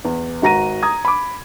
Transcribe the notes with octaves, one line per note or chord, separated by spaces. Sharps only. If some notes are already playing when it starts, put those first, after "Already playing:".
E2
G#1 F#4 A#5 A#6 D#7
A#5 D#6 G#6
B5 D6